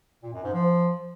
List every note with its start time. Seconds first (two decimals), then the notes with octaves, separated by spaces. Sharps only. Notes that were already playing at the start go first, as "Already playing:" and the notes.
0.23 A#2
0.33 F#2
0.43 G#2
0.54 F3